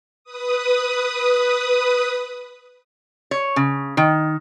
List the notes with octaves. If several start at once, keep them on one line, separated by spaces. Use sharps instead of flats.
B4 D#6
C#5
C#3
D#3